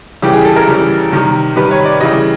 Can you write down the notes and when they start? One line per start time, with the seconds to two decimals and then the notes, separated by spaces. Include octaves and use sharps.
0.22 C#3 E3 G3 G4
0.33 G#4
0.45 A4
0.56 A#4
0.67 C#3 E3 G3
1.12 C3 D#3 G3
1.56 C3 D#3 G3 B4
1.71 C#5
1.86 D5
2.00 C#3 E3 G3 D#5